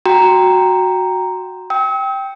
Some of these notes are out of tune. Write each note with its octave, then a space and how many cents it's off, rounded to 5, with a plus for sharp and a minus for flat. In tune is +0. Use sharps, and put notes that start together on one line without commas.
F#4 -5 G5 +0 A#5 +0
G5 +0 E6 -45